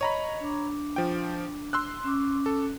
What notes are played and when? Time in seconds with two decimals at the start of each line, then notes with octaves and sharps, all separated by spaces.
0.01 C#5 D#5 A#5 B5
0.41 D4 D6
0.96 F3 G5
1.73 C6 E6 F#6
2.04 C#4 D6
2.46 A4